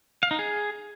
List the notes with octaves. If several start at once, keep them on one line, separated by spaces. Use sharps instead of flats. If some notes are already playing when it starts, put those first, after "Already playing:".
F5
D#4
G#4